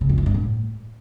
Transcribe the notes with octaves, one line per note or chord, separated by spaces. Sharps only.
C#3
F2
E3
G2
A2